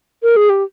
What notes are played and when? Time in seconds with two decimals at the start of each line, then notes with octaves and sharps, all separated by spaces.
0.23 A#4
0.36 G#4
0.50 G4